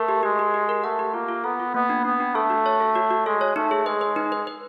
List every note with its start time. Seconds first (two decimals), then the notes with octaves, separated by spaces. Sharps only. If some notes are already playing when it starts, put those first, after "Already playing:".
Already playing: A3 A#4
0.09 G4
0.23 G#3 G4
0.39 G4
0.54 G4
0.69 A#4
0.84 A3 F#5
0.99 G4
1.14 A#3 F4
1.29 F4
1.44 B3 A4
1.60 F4
1.74 A#3 B3
1.89 D4
2.04 B3 D4
2.20 D4
2.35 A3 A4
2.50 F#4
2.66 C#5
2.80 A4
2.95 F#4
3.11 F#4
3.26 G#3 A4
3.41 C#5
3.56 A3 D#4
3.71 G#4
3.86 G#3 B4
4.01 B4
4.16 D#4
4.32 B4
4.47 B4